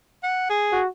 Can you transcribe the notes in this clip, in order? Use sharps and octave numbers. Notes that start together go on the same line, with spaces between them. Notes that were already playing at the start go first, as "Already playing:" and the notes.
F#5
G#4
F#4